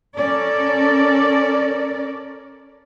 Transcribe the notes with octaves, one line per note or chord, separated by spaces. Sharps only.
C#4 A4 A#4 D5